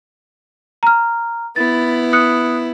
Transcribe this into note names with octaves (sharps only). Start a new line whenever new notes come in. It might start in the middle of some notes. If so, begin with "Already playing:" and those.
A#5 F6
B3 E4 A6
D#6 F#6 C#7